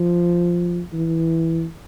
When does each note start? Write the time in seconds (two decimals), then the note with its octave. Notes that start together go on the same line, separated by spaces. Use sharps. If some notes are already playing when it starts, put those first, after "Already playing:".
Already playing: F3
0.93 E3